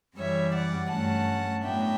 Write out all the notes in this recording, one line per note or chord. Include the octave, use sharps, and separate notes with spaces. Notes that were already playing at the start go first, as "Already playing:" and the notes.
F#2 E3 G3 C#5 E5
D5 F#5
G2 F#3 A3 C#4 F#5 A5
A2 F#3 B3 D4 E5 G5